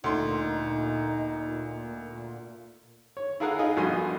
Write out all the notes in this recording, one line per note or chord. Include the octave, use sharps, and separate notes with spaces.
D2 A#2 D#4 C6
C#5
E4 F4 G#4 A#4 F5 F#5
D#4 F4 G#4 D#5
A#1 G2 B2 F#4 G#5 C6